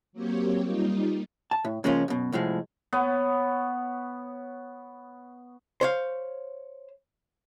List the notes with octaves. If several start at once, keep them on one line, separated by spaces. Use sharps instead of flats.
F#3 A#3 C4 G4 C#5
G3 A#3 D#4 F4
A5
A2
C#3 F3 G#3 A#3 C#4 F4
F#2 B2
C2 A2 F3 G#3
B3 C#5
C5 C#5 F5